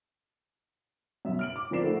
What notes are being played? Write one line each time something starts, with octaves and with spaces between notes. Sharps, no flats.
F#2 B2 E5
F6 D7 F#7
D6
F3 C4 A#4 D5 C7 E7
A3 D4 E4 F#4 A4